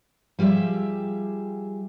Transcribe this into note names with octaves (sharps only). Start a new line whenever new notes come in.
F3 G3 G4 G#4 E5